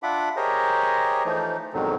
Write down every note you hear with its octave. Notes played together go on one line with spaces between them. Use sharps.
D4 F4 E5 F#5 B5 D6
G4 G#4 A#4 C5 C#5 D#5
E3 F3 A3 D#4
F2 G#2 B2 D3 D#3 F#3